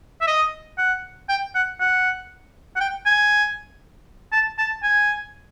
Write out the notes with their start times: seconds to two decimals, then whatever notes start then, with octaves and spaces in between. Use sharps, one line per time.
0.21 E5
0.27 D#5
0.78 F#5
1.29 G5
1.55 F#5
1.80 F#5
2.76 F#5
2.80 G5
3.06 G#5
4.32 A5
4.58 A5
4.83 G#5